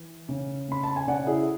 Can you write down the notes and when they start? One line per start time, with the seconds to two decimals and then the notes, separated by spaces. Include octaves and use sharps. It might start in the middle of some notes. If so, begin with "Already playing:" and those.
Already playing: E3
0.29 C#3
0.68 C#3 B5
0.84 A5
0.96 G#5
1.07 C#3 D5 F#5
1.27 E4 G#4